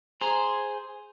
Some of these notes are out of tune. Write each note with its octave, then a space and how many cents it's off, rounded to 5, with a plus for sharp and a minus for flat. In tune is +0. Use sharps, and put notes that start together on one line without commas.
G#4 +0 C5 +0 A#5 +0